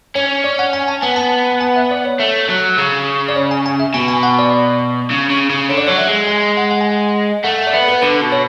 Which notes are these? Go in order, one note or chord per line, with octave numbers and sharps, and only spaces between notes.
C#4 C#5
D5
F#5
G#5
A5
B3 G#5
A5
A5
G#5
E5
D5
C#5
A3
F#3
C#3
D5
C#5
G#5
G#5
E5
B2 G#5
G#5
F#5
D5
C#3
C#3
C#3
D3 C#5
D5
F#3 C#5
E5
G#3
G#5
G#5
F#5
F#5
G#5
F#5
A3 F#5
F#5
D5
B3 E5
B4
D3 B4
B2
C#5